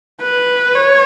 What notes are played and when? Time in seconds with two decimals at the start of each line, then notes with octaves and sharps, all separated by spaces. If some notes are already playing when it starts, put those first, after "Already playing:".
0.21 B4
0.75 C#5